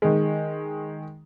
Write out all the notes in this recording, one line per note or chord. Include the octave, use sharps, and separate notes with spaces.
D#3 G#3